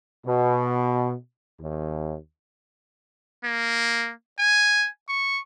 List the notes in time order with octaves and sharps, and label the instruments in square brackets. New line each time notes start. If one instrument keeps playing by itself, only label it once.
[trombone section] B2
D#2
[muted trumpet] A#3
G#5
C#6